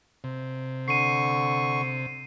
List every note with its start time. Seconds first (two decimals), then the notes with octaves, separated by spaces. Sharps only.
0.24 C3
0.88 D3 C#6 C7 D#7